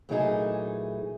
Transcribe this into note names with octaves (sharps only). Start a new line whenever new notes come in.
A#2 E3 F#3 A3 D#4 G#4